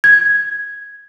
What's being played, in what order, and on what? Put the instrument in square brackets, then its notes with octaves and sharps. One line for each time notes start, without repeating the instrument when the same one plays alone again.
[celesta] G#6